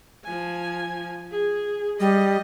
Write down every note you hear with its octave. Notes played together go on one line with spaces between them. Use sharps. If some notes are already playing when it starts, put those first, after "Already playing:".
F3 G#5
G#4
G3 D#5